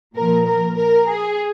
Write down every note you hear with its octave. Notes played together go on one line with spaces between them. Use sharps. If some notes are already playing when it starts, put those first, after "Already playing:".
A#2 F3 A#4
A#4
A#4
G#4